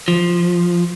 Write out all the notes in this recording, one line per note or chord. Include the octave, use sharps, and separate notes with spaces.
F3